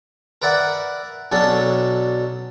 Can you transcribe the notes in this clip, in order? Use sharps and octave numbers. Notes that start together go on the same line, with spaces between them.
A#4 B4 D5 E5 F#5
B1 F#3 C#4 D4 A4